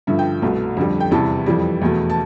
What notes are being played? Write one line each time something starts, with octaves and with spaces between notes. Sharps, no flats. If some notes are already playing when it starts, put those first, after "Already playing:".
G2 D3 F3 E5
G5
C2 B2 A3
F2 D3 G3
G5
E2 C3 E3 G3 A5
F2 E3 G3
E2 B2 A3
A5